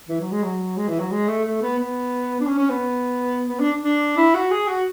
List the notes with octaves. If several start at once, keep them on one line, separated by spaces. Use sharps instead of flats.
E3
F#3
G#3
F#3
G#3
E3
F#3
G#3
A3
A3
B3
B3
D4
C#4
C#4
B3
B3
D4
D4
E4
F#4
G#4
F#4